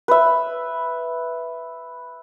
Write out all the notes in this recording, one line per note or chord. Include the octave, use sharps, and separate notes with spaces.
B4 E5